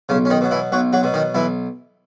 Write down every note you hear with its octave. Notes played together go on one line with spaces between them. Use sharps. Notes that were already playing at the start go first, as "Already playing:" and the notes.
B1 C#3 C#4
C#4
D#3 D#4
B2 F#3
E3 E4
B1 F#3 F#4
F#3 F#4
B2 F#3
D#3 D#4
B1 E3 E4